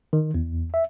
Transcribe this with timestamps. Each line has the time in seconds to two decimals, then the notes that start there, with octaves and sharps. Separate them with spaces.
0.13 D#3
0.34 E2
0.74 E5